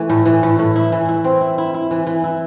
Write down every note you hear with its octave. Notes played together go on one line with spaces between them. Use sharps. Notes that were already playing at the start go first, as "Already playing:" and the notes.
Already playing: E3 A3
A2
E3
A2
A2
E4
E3
E4
C4
E4
E4
E4
E3
E3
E4